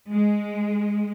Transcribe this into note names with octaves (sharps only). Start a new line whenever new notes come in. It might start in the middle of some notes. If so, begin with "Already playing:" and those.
G#3